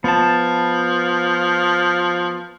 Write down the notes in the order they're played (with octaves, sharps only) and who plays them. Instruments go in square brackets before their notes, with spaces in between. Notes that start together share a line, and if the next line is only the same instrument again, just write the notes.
[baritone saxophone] F3 [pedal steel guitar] B3 A5